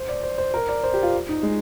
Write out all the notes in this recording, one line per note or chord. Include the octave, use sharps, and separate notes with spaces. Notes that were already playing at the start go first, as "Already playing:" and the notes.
Already playing: C5
D5
C5
C5
A#4
D5
C5
G4
F4
D#4
G#3